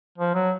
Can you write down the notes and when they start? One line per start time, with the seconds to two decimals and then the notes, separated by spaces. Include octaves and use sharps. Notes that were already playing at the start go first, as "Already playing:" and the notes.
0.18 F3
0.34 F#3